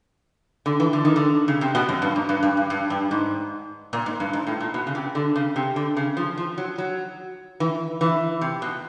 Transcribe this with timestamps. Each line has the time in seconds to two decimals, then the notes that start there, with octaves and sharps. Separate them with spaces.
0.66 D3
0.80 E3
0.93 D3
1.05 D#3
1.16 D3
1.48 C#3
1.61 C3
1.75 B2
1.89 F#2
2.02 G2
2.16 G#2
2.29 G2
2.43 G2
2.57 G2
2.70 G2
2.90 G2
3.11 G#2
3.93 A#2
4.06 G#2
4.20 G2
4.33 G#2
4.47 A2
4.60 A#2
4.74 B2
4.87 C#3
4.95 C3
5.15 D3
5.36 C#3
5.56 C3
5.76 D3
5.97 C#3
6.17 F3
6.38 F3
6.58 F#3
6.78 F#3
7.60 E3
8.01 E3
8.41 C3
8.62 B2